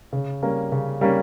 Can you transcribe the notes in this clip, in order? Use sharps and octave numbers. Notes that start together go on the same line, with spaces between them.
C#3
G3 A#3 C#4
C#3
G3 A#3 C#4